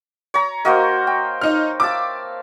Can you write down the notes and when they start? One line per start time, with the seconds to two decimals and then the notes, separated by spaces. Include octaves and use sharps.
0.34 C#5 A#5
0.65 A#3 F#4 A#4 C5 D#5
1.07 G5
1.41 D#4 F6
1.80 E5 F5 A5 D6